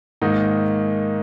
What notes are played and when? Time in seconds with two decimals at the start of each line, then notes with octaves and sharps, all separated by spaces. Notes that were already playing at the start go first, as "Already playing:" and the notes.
0.21 G#2 D#3 A#3 D#4